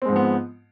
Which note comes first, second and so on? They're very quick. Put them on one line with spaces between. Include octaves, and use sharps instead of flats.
C4 G#3 G#2 F3 B3